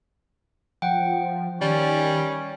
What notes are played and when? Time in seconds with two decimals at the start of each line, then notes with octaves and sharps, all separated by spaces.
0.82 F3 F#5 G5
1.61 D#3 G3 C#4 D5